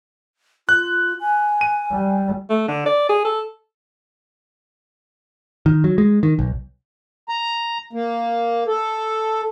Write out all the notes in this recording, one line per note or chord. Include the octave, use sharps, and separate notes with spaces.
F4 F#6
G#5
D#7
G3
A3
D3
D5
G#4
A4
D#3
F#3
G#3
D#3
B1
A#5
A#3
A4